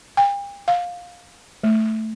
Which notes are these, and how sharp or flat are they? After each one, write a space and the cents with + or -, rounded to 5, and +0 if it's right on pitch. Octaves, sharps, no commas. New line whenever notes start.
G5 +40
F5 +15
A3 +0